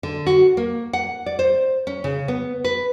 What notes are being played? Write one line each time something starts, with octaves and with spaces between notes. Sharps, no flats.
D3
F#4
A#3
F#5
D5
C5
C#4
C#3
B3
B4